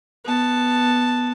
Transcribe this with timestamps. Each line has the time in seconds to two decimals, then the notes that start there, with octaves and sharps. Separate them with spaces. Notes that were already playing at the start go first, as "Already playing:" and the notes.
0.25 B3 A5